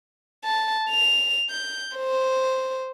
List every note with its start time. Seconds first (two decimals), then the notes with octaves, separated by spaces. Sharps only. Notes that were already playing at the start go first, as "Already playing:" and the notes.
0.45 A5
0.90 F7
1.50 G6
1.97 C5